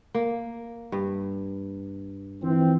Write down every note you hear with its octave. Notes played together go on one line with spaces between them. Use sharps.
A#3
G2
E3 F3 C4